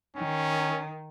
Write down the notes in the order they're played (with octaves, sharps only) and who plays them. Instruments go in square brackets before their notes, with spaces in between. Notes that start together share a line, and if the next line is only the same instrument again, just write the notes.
[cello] D#3 [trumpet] C#4